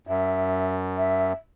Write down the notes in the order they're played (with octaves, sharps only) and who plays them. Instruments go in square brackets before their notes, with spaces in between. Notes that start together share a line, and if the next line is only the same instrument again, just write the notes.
[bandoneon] F#2 [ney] E5
[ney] E5